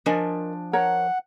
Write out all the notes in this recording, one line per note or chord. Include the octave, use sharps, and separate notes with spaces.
F3 D4 A#4 D#5 G#5
A#4 C#5 F#5 A#5